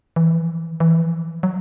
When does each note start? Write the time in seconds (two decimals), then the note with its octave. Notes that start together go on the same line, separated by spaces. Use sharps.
0.16 E3
0.38 F3
0.59 E3
0.71 D#3
0.80 E3
1.01 F3
1.43 F#3